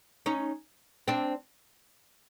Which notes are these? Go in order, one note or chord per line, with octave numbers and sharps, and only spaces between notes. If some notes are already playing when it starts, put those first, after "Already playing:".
C#4 D#4
C4 D4